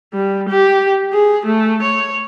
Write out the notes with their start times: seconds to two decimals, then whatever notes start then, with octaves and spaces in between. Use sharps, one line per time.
0.14 G3
0.49 G4
1.13 G#4
1.46 A3
1.83 C#5